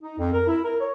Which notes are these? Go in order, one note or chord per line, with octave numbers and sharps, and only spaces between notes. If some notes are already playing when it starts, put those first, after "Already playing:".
D#4
F2
A#4
E4
A#4
C#5